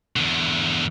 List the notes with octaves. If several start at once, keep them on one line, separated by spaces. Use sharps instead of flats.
E2 D3